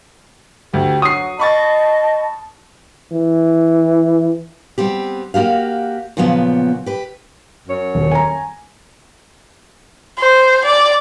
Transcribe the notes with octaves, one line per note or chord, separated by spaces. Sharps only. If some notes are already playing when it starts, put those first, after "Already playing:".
D2 G4
F#3 C#6 D#6 C7
D#5 A5 B5 C#6 A6
E3
G3 B3 C4 G4
A#3 F#4 G4 F5
A#2 C#3 F3 F#3 B3
G4 B4
F#2 F#3 C#5
D#1
G#5 A#5
C5
D5